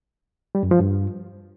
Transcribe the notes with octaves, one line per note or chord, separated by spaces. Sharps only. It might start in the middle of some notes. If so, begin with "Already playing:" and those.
G3
F#2
F3
G2